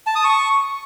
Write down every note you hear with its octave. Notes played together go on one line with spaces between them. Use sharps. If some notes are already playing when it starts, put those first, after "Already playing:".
A5
D#6
C#6